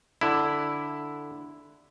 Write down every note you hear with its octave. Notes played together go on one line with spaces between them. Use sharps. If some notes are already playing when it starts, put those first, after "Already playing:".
D3 E4